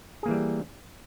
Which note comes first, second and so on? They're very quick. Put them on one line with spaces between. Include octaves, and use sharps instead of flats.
G#4 A#3 E3 G3